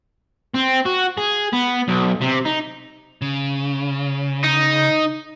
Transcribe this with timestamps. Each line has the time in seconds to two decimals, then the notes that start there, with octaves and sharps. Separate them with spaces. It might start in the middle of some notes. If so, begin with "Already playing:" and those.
0.54 C4
0.85 F#4
1.17 G#4
1.53 B3
1.88 B1
2.21 C3
2.45 D#4
3.22 C#3
4.44 D#4